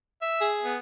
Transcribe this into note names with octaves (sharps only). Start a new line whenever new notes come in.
E5
G#4
B3